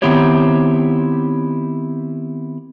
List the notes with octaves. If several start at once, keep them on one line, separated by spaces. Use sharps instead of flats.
D#3 B3 C4 E4 G4 C#5